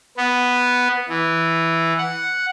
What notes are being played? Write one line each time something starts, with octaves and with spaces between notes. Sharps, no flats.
B3
E3
F#5